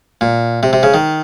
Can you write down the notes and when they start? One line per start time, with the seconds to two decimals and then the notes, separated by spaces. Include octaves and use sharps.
0.21 A#2
0.63 C3
0.73 C3
0.83 C#3
0.94 D#3